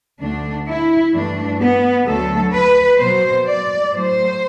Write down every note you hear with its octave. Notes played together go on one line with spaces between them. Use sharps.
D2 D3 A3 D4
E4
G2 E3 A3 D4
B3
D2 D3 F#3 A3 A4
B4
B2 F#3 B3 C5
D5
A2 F#3 A3 C5